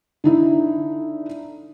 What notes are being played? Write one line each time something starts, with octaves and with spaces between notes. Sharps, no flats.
D3 D#4 E4